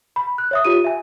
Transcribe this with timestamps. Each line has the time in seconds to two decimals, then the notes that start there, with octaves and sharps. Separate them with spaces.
0.16 B5
0.38 F#6
0.51 C#5 E5 D#6
0.65 F4 G4 D#7
0.84 E5 G#5